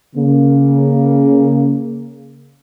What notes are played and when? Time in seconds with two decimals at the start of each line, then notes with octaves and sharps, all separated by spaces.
0.16 C#3 A#3